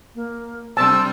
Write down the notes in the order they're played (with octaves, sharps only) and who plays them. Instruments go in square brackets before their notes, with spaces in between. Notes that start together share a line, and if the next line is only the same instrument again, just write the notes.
[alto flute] A#3
[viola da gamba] C3 G3 D4 [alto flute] C5 [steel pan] A5 [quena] E6